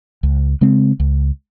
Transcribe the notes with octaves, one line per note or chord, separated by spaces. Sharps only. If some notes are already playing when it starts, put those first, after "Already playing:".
C#2
C#3 G#3 C4
C#2